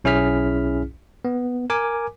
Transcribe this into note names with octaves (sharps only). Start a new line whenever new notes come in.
B1 C#4 E4 G#4 F6 B6
B3
A#4 G#5 D6